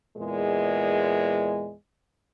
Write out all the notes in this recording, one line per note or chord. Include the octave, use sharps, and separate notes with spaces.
E2 A#2 G#3